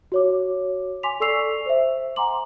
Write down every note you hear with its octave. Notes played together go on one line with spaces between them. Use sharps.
F#4 C#5 D6
G#5 C6 D6 B6 F7
A4 D5 C#6 E6 C7 F7
C5 E5
F#5 G#5 A#5 C6 D6 F#7